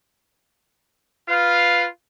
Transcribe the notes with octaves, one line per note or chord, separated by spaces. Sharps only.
F4 B4 F5